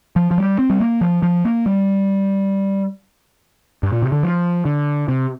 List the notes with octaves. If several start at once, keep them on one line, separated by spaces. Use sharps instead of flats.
F3
F3
G3
C4
G3
A#3
F3
F3
A#3
G3
G2
A#2
C3
D3
F3
D3
C3